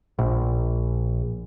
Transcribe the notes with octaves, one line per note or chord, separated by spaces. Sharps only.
A#1